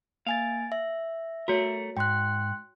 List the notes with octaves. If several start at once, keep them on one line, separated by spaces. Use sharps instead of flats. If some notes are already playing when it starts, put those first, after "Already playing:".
A#3 F5 G#5 A6
E5
A3 F#4 A#4 C#5
G#2 G5 C6 F#6